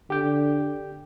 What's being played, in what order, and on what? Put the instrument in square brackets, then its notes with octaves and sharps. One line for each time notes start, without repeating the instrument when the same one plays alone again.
[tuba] D3 [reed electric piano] G4 G5